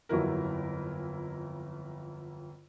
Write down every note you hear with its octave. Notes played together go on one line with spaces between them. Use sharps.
G1 F2 F#3 E4 A#4